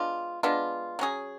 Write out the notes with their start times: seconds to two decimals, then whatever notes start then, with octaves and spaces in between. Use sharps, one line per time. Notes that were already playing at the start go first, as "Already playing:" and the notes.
Already playing: G#3 B3 D4 F4
0.43 G#3 B3 D4 F4
0.99 F#3 C#4 G#4